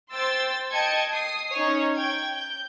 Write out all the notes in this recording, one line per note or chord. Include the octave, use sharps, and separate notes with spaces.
C5 G5 C6 E6 A6
D#5 G5 A5 G#6 C#7
D#6 C7
C#4 D#4 C#5
G5 G#6
G6